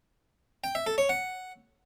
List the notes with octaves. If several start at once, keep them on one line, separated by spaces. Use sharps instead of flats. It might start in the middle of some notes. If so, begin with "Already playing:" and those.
G5
E5
A4
C#5
F#5